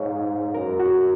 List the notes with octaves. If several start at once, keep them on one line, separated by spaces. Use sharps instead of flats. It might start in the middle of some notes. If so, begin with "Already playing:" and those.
Already playing: G#2 C#5 F5
F#2 A#4
F#4